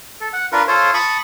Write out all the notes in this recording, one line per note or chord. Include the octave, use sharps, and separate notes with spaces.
A4
F#5
D4 F4 A#4 B4
F4 A4 C5 C#5
A5 B5 C#6 D#6